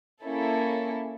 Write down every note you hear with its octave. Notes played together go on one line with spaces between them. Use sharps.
A#3 C#4 E4 A4